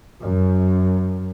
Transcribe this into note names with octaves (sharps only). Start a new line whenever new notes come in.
F#2